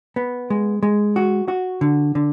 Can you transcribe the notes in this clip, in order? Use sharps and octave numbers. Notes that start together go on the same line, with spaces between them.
B3
G#3
G#3
F#4
F#4
D3
D3